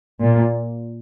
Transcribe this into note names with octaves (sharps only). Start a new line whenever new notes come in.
A#2